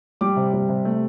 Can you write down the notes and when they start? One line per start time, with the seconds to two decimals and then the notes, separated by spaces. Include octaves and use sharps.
0.21 G3 D6
0.36 C3
0.53 G3
0.69 C3
0.85 A3